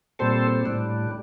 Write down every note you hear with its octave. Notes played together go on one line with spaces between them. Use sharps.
A#2 G3 C4 A4 C5
A2 G3 D4